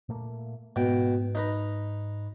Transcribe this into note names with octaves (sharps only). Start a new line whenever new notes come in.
A#2 A3 A#3
G#2 B2 G5
D#4 B4 A#5